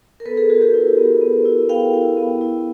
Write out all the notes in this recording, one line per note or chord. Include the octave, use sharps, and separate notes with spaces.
A#4
B3 A4 B4
G#4 A#4
B3 F#4 G#4
G4
E4
B3
B3
E4
B3 F5 G5
E4
B3
E4